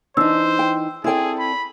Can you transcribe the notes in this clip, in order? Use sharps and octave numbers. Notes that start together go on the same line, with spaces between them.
E3 D4 D#4 C5 E6
G5
C4 E4 G#4 A4 D5 G5
B5